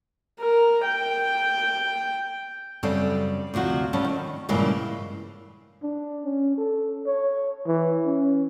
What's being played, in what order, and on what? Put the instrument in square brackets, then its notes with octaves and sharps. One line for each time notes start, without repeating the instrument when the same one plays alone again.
[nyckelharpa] A#4
G5
[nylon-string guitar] F#2 C#3 G3 C4 A4
D2 C3 F3 F#4
F#3 G3 B3 C#4 A5
D#3
G2 A#2 C#3 E3 F3 G#3
[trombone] D4
C#4
A4
C#5
E3
C#4